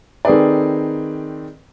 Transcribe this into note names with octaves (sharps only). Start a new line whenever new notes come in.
D#3 C4 G#4 A4 B4 D5